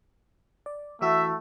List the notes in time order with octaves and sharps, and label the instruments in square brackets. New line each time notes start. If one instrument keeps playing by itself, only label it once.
[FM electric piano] D5
[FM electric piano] E3 E4 F#4 [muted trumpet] A3 [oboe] E5